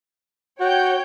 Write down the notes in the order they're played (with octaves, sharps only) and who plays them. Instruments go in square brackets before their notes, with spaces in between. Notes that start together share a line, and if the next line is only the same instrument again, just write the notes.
[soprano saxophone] F#4 [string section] C#5 G5 G6